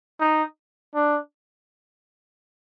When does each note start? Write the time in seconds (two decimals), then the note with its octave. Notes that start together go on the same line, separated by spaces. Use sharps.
0.20 D#4
0.95 D4